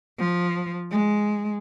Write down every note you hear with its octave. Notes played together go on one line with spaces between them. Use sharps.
F3
G#3